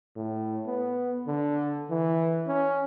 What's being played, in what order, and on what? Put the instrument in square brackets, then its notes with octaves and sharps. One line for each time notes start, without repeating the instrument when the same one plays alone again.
[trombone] A2
B3
D3
E3
C#4